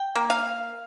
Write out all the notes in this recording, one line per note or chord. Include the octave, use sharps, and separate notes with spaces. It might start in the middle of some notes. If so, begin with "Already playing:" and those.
Already playing: G5
A#3
F5